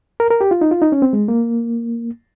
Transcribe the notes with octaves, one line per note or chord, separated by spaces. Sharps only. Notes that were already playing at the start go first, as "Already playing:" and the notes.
A#4
A#4
G4
F4
D#4
F4
D#4
C#4
C4
G#3
A#3